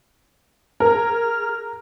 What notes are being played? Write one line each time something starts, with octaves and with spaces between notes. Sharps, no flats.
G#4 A#4 F6